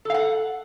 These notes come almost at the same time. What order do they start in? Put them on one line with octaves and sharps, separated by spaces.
A4 F5 F#5